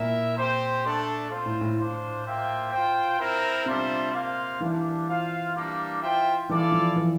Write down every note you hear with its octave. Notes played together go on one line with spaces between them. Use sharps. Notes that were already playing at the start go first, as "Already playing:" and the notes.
Already playing: A#2 E4 A#4 E5
C4 G4 C5
A3 D4 A4
C4 F4 C5
A2
A2
D4 F4 C5
A#3 F4 C5 E5 G5
F4 C5 G5
C4 E4 A#4
C3 G3 D4 F4 C5 E5
A#3 F4 C5 F5
E3 G3 A#3 D4
F4 C5 F5
G3 A#3 D4
F4 C5 E5 G5
E3 E4 A4 D5 F5
F3
E3